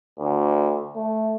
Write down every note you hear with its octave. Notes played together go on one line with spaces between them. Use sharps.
D2
A3